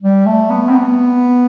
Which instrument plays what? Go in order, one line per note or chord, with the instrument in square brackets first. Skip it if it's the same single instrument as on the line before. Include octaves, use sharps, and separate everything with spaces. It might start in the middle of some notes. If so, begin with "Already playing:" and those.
[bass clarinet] G3
A3
B3
C4
B3